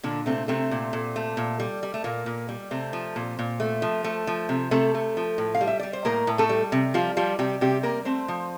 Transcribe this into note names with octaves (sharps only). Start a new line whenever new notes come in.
A#2 D3 D4
C3 A3 C4
C3 A3 C4
A#2
A#2
A3
A#2
G3
G3
A3
A#2 A#3
A#2
G3
C3 A3 C4
F3
A#2
A#2
A3
F3
A3
F3
C3
C3 A3 A4
A3
F3
A2
F5
G3
E5
G3 D5
C5
A2 A#3 A#4
A2
A3 A4
G3
C3
F3 G3 F4
F3 G3 F4
C3 G3 G4
C3 G3 G4
G3 A#3 A#4
A3 C4 C5
F3